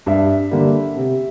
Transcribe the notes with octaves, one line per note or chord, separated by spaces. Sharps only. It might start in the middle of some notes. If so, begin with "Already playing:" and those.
G2 E5
D3 G3 A#3
C3